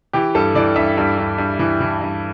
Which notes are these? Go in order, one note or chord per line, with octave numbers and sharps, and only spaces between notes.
E3 G4
G2 A4
E3 D5
G2 E5
G2
G2
G2
E3
E3
G2